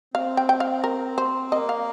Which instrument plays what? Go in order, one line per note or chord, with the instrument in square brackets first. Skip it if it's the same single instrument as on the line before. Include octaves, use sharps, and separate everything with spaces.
[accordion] C4 [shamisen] F5
[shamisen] G5
G5
F5
A#4
C5
[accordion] A#3 [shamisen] D#5
[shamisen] F5